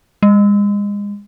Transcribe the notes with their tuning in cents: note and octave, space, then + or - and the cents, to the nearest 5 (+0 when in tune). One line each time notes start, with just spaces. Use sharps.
G#3 -35